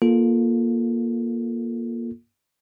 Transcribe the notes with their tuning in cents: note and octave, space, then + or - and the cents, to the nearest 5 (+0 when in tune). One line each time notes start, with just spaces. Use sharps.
A#3 +15 F4 +0 A4 +0